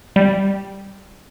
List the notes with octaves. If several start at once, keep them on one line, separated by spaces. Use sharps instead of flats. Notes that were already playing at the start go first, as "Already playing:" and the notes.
G3